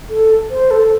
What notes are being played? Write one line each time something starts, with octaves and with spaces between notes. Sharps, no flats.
A4
C5
A4